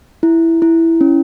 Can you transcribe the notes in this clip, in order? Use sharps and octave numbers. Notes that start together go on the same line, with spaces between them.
E4
E4
C#4